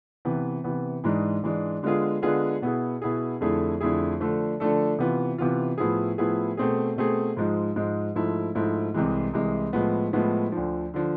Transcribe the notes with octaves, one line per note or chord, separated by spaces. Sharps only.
C3 E3 B3
C3 E3 B3
G#2 E3 G#3 D4
G#2 E3 G#3 D4
D3 G#3 B3 F4 G#4
D3 G#3 B3 F4 G#4
B2 B3 E4 G#4
B2 B3 E4 G#4
F2 D3 A3 E4 G#4
F2 D3 A3 E4 G#4
D3 F3 A3 D4 A4
D3 F3 A3 D4 A4
C3 E3 B3 F4
C3 E3 B3 F4
A2 F3 B3 E4 G#4
A2 F3 B3 E4 G#4
B2 A3 C4 G#4
B2 A3 C4 G#4
G#2 F3 G#3
G#2 F3 G#3
G#2 F3 A3 E4
G#2 F3 A3 E4
C2 C3 E3 G#3
C2 C3 E3 G#3
A2 F3 G#3 B3
A2 F3 G#3 B3
D2 D3 F3
D3 F3